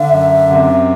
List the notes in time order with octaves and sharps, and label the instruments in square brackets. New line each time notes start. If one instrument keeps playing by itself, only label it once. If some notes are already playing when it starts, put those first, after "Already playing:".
Already playing: [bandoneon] D3 [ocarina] E5
[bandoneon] F#2
C3